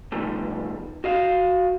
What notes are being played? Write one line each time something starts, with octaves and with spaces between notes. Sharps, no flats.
B2 D3 D#3 F3 G3 A3
F#4 D#5 F5